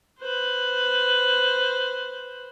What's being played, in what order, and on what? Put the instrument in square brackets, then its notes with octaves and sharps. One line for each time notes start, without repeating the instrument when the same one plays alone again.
[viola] B4 C5